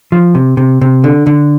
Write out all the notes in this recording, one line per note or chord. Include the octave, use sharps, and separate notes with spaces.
F3
C3
C3
C3
D3
D3